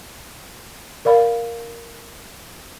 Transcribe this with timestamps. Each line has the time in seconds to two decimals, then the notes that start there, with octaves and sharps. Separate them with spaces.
1.05 A#4 D5 F5 B5